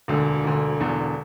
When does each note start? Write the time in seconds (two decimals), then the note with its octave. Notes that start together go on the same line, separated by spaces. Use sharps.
0.08 E1 D2 D3
0.44 E1 D2 D3
0.80 E1 E2 D3 B3